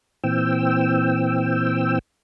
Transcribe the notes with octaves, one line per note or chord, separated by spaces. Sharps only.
A#2 E3 C4 G5 E6